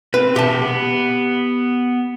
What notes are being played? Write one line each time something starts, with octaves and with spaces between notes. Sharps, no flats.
C4 B4
B2 G4 E5 A5
B3